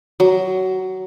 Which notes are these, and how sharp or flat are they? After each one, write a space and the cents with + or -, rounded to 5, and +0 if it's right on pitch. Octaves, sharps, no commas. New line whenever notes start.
F#3 +15